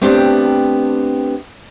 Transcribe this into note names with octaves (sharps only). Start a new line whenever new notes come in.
A3 B3 C4 D4 G4